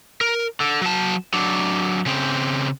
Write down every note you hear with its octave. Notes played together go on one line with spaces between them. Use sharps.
A#4
D3
F#3 A5
F#3 D4
C#3 C4